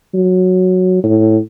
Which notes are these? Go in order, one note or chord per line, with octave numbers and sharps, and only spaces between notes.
F#3
A2